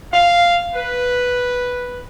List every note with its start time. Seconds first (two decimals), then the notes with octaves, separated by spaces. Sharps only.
0.13 F5
0.74 B4